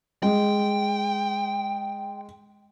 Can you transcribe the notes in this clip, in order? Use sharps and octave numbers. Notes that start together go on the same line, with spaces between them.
G#3 G5